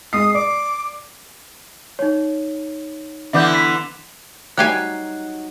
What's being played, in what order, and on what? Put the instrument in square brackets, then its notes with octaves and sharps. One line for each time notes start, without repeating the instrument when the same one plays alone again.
[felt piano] G#3 C7 [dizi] D#6
[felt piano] D5 [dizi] D6
[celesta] D#4 C#5
[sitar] D3 E3 B3 [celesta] E5 D6 G6
[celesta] B6
[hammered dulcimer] F#3 D#4 [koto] G3 G4 G#5 [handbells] F#6 G#6 C7